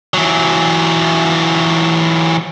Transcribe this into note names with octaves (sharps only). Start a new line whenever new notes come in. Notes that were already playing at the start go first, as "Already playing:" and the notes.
E3 F#3